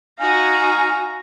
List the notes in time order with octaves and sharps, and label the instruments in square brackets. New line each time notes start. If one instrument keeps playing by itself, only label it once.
[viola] D#4 F#4 [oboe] F5 [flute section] G#5 [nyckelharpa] A#5 C#6